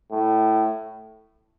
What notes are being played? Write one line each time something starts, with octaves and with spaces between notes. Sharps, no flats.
A2